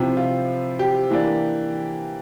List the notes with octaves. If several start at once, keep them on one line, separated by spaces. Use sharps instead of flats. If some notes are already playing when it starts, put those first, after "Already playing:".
Already playing: C3 F3 C4 E4
F4
G4
E3 A#3 D4